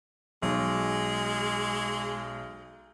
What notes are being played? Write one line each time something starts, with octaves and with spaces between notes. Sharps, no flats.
B1 G#3